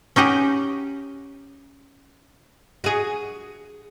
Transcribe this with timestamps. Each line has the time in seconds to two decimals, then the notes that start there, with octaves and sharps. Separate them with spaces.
0.16 C#4 D#4 G4 F#5
2.84 F#4 G#4